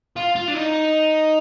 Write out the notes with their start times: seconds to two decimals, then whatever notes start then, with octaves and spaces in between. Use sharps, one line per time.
0.16 F4
0.35 F4
0.48 D4
0.54 D#4